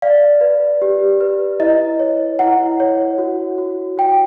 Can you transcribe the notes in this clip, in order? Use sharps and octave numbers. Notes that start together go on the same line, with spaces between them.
D5 F5
B4
G4
B4
E4 D#5
C#5
E4 F#5
C#5
F#4
F#4
F#4 G5